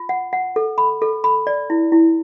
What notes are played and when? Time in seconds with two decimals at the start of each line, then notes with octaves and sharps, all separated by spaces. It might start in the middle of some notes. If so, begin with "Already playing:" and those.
Already playing: F4
0.09 F#5
0.33 F#5
0.56 A4
0.78 B5
1.02 A4
1.24 B5
1.47 D5
1.70 E4
1.92 E4